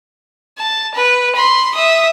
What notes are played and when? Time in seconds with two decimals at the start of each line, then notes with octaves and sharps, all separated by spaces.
0.58 A5
0.94 B4
1.36 B5 C6
1.75 E5 D#6